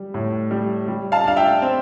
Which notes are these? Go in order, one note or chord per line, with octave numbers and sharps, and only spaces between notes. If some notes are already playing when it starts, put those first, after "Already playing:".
Already playing: G3
A2
G3
G3
F5 A5
D4 F5
E5 G5
C4